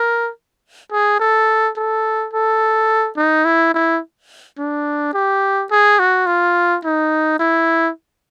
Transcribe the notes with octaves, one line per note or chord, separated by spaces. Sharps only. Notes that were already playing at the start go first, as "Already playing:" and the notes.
Already playing: A#4
G#4
A4
A4
A4
D#4
E4
E4
D4
G4
G#4
F#4
F4
D#4
E4